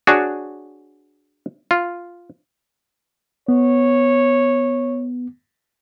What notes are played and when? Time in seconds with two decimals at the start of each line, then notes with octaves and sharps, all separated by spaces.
0.07 D4 F#4 G#4 C#5 D5
1.71 F4
3.48 B3 C#5